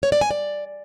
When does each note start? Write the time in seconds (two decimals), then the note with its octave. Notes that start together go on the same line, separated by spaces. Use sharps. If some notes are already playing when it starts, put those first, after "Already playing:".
0.03 C#5
0.12 D5
0.21 G#5
0.31 D5